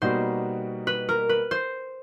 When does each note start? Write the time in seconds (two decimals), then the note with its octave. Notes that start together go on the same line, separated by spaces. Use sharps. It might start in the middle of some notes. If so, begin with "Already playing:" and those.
0.02 B2 G3 A#3 D#4 F#4 C5
0.87 B4
1.09 A#4
1.29 B4
1.51 C5